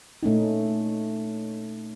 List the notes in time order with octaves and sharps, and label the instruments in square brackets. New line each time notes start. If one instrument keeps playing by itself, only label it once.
[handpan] A#2 A3 C#4 D#4